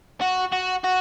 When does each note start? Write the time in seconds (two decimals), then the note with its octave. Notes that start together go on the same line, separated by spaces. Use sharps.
0.21 F#4
0.52 F#4
0.84 F#4